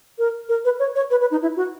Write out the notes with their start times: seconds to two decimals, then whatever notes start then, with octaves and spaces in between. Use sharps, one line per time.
0.19 A#4
0.49 A#4
0.65 B4
0.79 C#5
0.95 C#5
1.11 B4
1.21 B4
1.31 D#4
1.42 E4
1.57 F#4